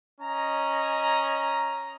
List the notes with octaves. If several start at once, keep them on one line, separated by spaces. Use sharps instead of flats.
C#4 D#5 A#5